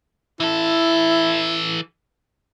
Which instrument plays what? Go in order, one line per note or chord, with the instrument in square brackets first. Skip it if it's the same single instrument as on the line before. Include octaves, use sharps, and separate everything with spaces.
[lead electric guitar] E3 A4 [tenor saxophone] E4